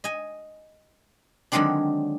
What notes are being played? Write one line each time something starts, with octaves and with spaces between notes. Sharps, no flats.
D#5 G#5
D3 D#3 F#3 G#3 C4 D4